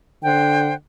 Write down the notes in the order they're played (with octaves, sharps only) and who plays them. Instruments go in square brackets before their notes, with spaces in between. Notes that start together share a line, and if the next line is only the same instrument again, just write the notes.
[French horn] D3 [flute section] C5 F#5 G5